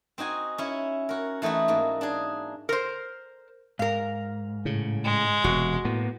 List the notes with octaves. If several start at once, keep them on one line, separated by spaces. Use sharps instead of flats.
C4 D#4 F#4 G#5
C#4 E4
F#4 A#4
E3 A3 D#4 E4 F#4
G#2 A#3
D4 G#4
A#4 C5
G#2 A#4 F5
A2 C#3
G#3
E1 C3 F#4
A2 A#3 B3